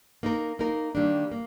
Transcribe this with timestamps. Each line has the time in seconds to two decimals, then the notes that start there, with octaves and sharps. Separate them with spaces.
0.23 A#3 D#4 A#4
0.59 A#3 D#4 A#4
0.95 D#3 G3 A#3 D4
1.31 A#3